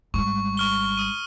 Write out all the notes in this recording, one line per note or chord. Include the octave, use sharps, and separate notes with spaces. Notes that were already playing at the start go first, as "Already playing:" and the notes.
G#1 G3 C#6
C#6 F6 G7
D#6 D#7